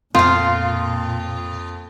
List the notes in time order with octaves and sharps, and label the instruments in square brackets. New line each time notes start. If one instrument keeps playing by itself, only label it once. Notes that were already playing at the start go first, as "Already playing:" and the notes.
[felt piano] F2 [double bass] A#2 [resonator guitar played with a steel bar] F4 [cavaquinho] C5 F5